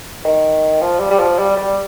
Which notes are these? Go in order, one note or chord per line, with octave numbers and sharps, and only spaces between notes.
D#3
F3
G3
G3
F3
G3
G3